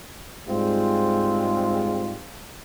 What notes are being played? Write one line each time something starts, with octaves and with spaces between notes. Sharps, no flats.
G#2 G3 G#3 C4 F4